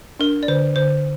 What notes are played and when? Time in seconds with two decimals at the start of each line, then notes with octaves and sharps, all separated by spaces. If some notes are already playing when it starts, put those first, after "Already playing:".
0.20 D4 A#4
0.43 D5
0.48 D3 C5
0.76 D3 C5